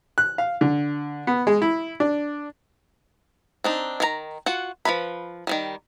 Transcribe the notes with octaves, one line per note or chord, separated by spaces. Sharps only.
F#6
F5
D3
B3
G#3
E4
D4
C4 D4 D#4
D#3 F4 A#5
F4 F#4 F#5
F3 A3 B4 B5
D#3 F#3 G3